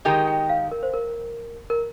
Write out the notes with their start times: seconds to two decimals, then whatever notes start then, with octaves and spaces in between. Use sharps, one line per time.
0.05 D#3 G#3 D#4 G4 A#4 G5
0.28 G5
0.49 F5
0.71 A#4
0.83 C5
0.94 A#4
1.70 A#4